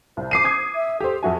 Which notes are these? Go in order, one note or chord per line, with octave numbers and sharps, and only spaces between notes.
C2 C5
D6 C7 D#7
D6 D#6 G#6
E5
G4 A4 C5
F2 F#4 E5 G#5